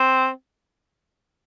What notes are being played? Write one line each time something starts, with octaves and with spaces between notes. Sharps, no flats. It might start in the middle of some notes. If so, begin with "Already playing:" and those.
Already playing: C4